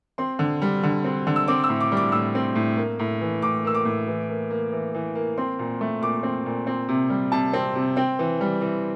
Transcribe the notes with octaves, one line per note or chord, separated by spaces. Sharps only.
C4 C6
D3
G3
D3
C4
D3
E6
C4 D6
E6
A2
D6
G3
D6
A2 E6
C4
A2
A#3
A2
E3
A2 D6
A#3 E6
D6
A2
E3
A#3
A#3
E3
E3
A#3
C4 C6
A#2
A3
A#2 D6
C4
A#2
C4
C3
G3
C3 A5
C4
C3
C4 G5
E3
G3
E3